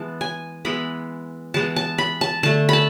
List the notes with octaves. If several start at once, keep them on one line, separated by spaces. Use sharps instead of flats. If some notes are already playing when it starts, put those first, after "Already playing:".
Already playing: E3 G#3 B3 A5
G#5
E3 G#3 B3 B5
E3 G#3 B3 A5
A5
B5
A5
D3 A3 A5
A5 B5